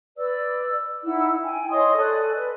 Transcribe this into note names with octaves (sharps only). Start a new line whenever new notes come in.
B4 D5 E6
D#4 E4 F#5 E6
G5 G#5
C#5 D#5 C6 D#6
A4 D5 G#5 F#6
B4